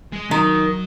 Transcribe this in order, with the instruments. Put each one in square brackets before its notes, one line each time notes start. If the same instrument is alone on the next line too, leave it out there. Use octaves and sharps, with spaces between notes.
[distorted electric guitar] G#3
[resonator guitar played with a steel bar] D#3 [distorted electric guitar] F#3